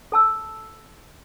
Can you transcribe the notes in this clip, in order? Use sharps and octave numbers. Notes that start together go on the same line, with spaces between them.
A4 A5 E6